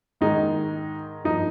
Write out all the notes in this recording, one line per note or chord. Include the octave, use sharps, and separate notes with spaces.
G#2 D#3 G#3 D#4
G2 F3 A#3 D#4